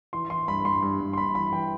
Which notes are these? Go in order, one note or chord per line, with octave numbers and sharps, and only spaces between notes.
E3 C6
E3 C6
G2 B5
G2 C6
G2
G2
C6
G2 B5
E3 B5
E3 G5